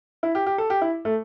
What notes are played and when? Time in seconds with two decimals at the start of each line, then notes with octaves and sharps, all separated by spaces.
0.23 E4
0.35 G4
0.46 G4
0.58 A4
0.70 G4
0.82 E4
1.05 A3